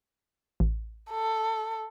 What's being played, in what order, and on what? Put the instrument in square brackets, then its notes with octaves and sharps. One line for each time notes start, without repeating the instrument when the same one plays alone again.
[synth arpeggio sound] A1
[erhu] A4